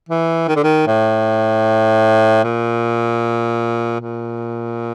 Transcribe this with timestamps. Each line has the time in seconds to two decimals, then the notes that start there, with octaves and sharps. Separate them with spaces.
0.09 E3
0.48 D#3
0.56 D3
0.64 D#3
0.87 A2
2.44 A#2
4.00 A#2